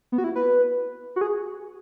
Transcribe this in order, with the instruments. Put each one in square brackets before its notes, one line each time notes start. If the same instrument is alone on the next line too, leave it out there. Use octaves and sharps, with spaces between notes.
[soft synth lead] B3
F#4
E4
B4
F#4
G#4